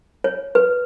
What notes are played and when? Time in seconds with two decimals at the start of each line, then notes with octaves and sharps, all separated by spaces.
0.24 C#5
0.55 B4